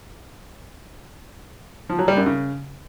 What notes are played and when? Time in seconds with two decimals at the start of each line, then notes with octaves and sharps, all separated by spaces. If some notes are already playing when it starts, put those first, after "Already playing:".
1.89 F3
1.99 F#3
2.08 G3
2.17 F#2
2.26 C#3